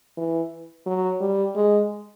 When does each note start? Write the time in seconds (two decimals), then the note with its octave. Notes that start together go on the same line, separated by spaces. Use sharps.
0.18 E3
0.86 F#3
1.21 G3
1.55 G#3